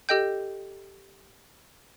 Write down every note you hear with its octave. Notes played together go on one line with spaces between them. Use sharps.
G4 A4 D#5 G5 G6